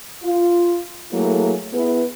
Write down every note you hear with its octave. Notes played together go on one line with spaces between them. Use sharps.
F4
F#3 A3 A#3 E4 G#4 A4
B3 E4 G#4 B4